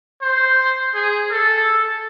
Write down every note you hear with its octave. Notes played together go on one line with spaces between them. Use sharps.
C5
G#4
A4